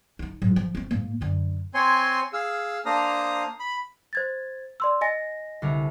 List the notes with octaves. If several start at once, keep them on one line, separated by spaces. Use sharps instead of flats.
D#4 E4
G#2 F#3
F3
C4 C#4
G#2 A#3
F#2 D3
C4 C#5 G#5 C6
G#4 F5 E6
A#3 D4 C5 A#5 D#6
B5
C5 G#6 A6
D5 C6 E6
D#5 G#5 A#6
C2 D3 A#4